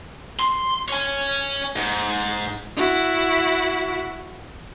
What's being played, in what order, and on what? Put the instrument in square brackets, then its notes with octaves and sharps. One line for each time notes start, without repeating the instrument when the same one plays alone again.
[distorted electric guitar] C6
C#5 G#5
G#2
[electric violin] E4 F#4